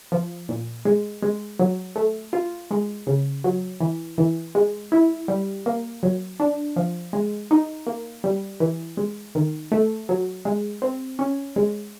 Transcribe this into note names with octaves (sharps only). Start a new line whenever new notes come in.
F3
A#2
G#3
G#3
F#3
A3
F4
G#3
C#3
F#3
E3
E3
G#3
E4
G3
A#3
F#3
D4
F3
G#3
D#4
A#3
G3
E3
G#3
D#3
A3
F#3
G#3
C4
C#4
G#3